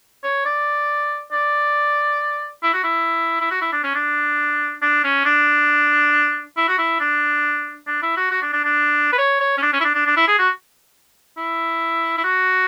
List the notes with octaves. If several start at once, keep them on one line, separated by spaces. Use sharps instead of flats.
C#5
D5
D5
E4
F#4
E4
E4
F#4
E4
D4
C#4
D4
D4
C#4
D4
E4
F#4
E4
D4
D4
E4
F#4
F#4
D4
D4
D4
B4
C#5
C#5
C#4
D4
C#4
E4
D4
D4
D4
E4
G#4
F#4
E4
E4
F#4